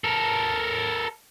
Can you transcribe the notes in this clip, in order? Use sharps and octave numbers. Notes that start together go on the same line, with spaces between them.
A4 A#4